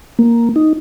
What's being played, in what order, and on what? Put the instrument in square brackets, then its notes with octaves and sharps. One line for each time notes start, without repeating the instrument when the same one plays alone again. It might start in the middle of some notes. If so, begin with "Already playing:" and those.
[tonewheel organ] A#3
D#4